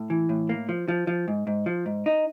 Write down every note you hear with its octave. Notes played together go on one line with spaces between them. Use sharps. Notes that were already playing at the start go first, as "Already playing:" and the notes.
Already playing: A2
E3
A2
A#3
F3
F3
F3
G#2
G#2
F3
G#2
D#4